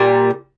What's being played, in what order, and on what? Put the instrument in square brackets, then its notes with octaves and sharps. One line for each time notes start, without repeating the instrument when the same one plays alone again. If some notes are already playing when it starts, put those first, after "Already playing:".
Already playing: [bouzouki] A#2 G3